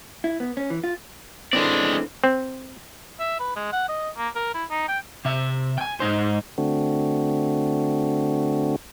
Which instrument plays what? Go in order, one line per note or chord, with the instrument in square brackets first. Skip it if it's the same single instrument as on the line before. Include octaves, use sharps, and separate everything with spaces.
[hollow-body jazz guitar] E4
B3
C#4
E3
F4
[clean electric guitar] D3 E3 C4 [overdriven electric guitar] G#3 D5
[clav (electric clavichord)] C4
[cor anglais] E5
B4
G#3
F#5
D#5
A#3
A#4
E4
D#4
G5
[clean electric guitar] C3 E5
G5 G#5
G#2 D#4 C5
[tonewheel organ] D3 A3 C4 D4 F#4